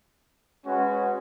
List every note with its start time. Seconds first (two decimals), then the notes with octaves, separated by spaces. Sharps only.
0.65 G#3 C#4 F#4 B4